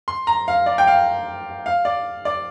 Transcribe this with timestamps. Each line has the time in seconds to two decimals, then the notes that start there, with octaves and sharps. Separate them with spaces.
0.08 C6
0.27 A#5
0.48 F5
0.66 D5
0.78 G5
0.87 F5
1.66 F5
1.85 D5
2.25 D5